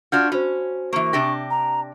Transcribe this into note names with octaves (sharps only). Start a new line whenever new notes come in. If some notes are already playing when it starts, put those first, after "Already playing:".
D4 F4 F#4 F6 G6 G#6
C#4 F#4 C5
E3 A#3 C#6
C3 D4 G4 A#6
A#5